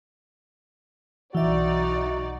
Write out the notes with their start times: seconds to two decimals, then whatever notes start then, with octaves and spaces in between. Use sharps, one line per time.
1.35 B1 E3 D#4 F#4 D5 E5